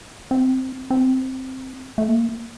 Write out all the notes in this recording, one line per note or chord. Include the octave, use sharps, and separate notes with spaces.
C4
C4
A3
A#3